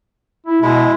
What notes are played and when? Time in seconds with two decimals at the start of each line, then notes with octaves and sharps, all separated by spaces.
0.47 E4
0.62 B2 G#3 E4